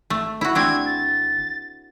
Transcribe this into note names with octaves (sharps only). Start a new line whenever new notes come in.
G#1 A3
E4 F#4
A3 C4 D4 G#6
A6